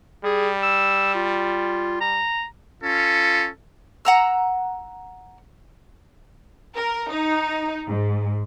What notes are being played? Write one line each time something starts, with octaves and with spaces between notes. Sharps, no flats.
G3 G#4
E6
F4
A#5
C#4 F4 A4
F#5 A#5 E6
A#4
D#4
G#2